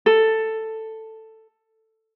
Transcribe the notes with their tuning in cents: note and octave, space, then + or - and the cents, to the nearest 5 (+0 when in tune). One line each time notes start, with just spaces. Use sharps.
A4 +10